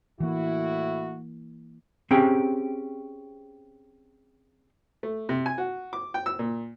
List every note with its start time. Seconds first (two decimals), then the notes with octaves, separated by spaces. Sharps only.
0.20 A2 E3 A#3 E4 F#4
2.11 C4 C#4 G4 G#4 G5
5.03 A3
5.29 C3
5.46 G#5
5.58 F#4
5.93 D6
6.14 G5
6.26 E6
6.39 A#2